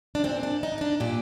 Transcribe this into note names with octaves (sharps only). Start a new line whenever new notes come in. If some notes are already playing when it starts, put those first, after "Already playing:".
D4
A#2 C4
D4
D#4
D#4
D4
A#2 G4